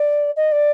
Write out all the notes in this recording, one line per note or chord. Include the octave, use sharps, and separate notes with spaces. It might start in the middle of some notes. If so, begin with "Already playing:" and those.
Already playing: D5
D#5
D5